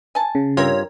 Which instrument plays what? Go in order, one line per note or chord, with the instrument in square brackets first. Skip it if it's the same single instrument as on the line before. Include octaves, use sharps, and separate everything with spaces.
[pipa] G#5 A5
[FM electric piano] C#3
[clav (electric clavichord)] G2 F4 [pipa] C4 A#4 [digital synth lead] C#5